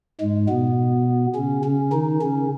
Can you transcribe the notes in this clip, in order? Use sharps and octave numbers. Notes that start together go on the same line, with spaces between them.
G#2 G#3
B2 B3
C#3 C#4
C#3 C#4
D#3 D#4
C#3 C#4